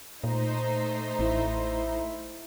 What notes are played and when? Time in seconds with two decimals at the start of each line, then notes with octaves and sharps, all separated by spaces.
0.24 A#2 A3 D#4 C5
1.19 A1 E4